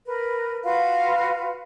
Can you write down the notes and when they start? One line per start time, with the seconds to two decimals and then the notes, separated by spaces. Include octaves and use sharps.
0.06 A#4 B4
0.64 F4 F#4 B4 F5